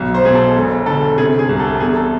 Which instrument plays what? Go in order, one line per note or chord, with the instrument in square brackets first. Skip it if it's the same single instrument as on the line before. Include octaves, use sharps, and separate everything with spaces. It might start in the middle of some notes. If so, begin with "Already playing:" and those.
Already playing: [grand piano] B1
C5
B2 G#4
A4
E1
D3 A4
C3 G#4
G#4
C2
A4
E2 G#4
A4